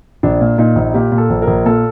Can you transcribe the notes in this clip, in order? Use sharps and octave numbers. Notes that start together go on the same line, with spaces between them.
A#1 D4
A#2
A#2 D#4
A#1
A#2 G4
A#2
A4
A#1
A#4
A#1
A#2 A4